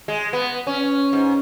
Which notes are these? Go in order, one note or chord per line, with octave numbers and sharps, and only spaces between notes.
G#3
B3
C#4
G#2